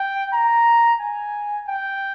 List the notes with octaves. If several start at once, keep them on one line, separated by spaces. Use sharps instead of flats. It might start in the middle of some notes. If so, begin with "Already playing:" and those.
Already playing: G5
A#5
G#5
G5